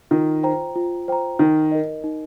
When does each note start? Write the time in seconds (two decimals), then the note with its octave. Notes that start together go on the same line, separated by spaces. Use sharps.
0.11 D#3 F4
0.43 C5 G5 A#5
0.76 F4
1.08 C5 G5 A#5
1.39 D#3 D#4
1.71 A#4 D#5
2.04 D#4